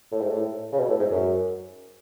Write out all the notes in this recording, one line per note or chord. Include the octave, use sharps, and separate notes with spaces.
A2
G#2
A2
C#3
B2
A2
G#2
F#2